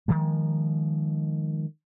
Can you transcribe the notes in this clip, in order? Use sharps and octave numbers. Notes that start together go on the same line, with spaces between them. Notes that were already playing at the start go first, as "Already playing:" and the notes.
D#3 F3 G#3